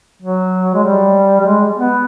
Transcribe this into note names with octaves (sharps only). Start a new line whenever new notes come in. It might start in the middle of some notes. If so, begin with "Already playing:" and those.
F#3
G#3
G3
G3
G#3
B3